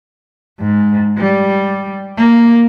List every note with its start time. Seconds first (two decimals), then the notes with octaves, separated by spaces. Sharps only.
0.60 G#2
1.17 G3
2.17 A#3